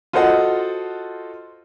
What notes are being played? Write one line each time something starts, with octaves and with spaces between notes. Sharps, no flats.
F4 F#4 A4 C5 D#5 F#5